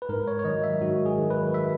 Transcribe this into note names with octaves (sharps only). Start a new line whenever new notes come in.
B4
G#2 A#4
C#5
C#5
D#3 F#3 D#5
E5
G#2 F#4
G#4
D#3 F#3
B4
E5